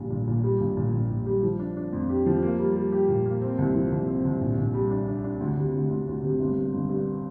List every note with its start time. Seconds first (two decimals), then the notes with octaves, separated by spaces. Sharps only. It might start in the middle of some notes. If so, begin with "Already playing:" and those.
Already playing: A#1 A#2 G3 D4
0.10 A#2
0.28 A#2
0.44 G3
0.60 A#1
0.77 A#2
0.93 A#1
1.10 A#2
1.26 G3
1.43 F3
1.59 D4
1.77 D4
1.93 F2
2.09 G4
2.26 F3
2.43 A#3
2.59 G3
2.76 G3
2.92 G4
3.08 A#2
3.26 A#3
3.42 C4
3.58 C2
3.75 F3
3.92 C2
4.08 C4
4.25 C2
4.41 A#1
4.58 A#1
4.74 G3
4.91 D4
5.08 D4
5.24 D4
5.40 D2
5.57 C3
5.74 D2
5.90 D2
6.07 D2
6.23 C3
6.40 G1
6.56 G2
6.74 G1
6.89 G2